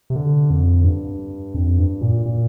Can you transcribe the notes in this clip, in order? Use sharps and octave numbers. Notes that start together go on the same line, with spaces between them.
C3
D3
F2
G2
F2
G2
A#2
A#2